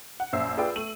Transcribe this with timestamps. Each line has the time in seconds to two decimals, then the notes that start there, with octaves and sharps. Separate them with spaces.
0.20 F#5
0.33 A#1 F#2 C5 E5 E6 C7
0.57 F4 G#4 B4 D5 G5
0.76 A3 D#7 F#7